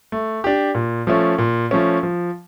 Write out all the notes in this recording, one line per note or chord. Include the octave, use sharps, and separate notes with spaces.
A3
D4 G4
A#2
F3 A3 C#4
A#2
F3 A3 C#4
F3